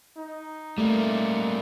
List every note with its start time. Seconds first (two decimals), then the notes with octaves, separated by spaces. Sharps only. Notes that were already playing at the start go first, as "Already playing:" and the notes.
0.17 D#4
0.78 G3 A3 A#3